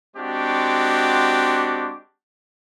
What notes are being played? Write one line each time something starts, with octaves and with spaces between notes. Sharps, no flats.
G#3 C4 D4 F#4 G4